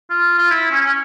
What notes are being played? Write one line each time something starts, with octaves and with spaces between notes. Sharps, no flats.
F4
F4
E4
C#4
C#4